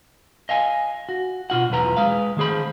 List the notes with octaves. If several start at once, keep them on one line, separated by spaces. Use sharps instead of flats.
D#5 F5 G#5
F#4
B2 F4 F#5
B1 E2 E3 B4 A#5
G#3 B4 F5
D#3 A3 G#4 C5 B5